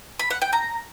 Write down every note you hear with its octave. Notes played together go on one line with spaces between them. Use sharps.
B5
F#5
G5
A#5